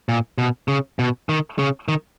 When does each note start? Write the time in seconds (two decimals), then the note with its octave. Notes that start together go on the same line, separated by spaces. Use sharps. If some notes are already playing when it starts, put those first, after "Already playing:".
0.09 A#2
0.38 B2
0.68 C#3
0.99 B2
1.29 D#3
1.59 C#3
1.88 D#3